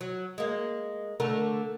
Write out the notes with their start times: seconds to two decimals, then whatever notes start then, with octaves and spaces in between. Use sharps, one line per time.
0.01 F#3
0.38 G#3 A#3
1.20 D3 A3 A#4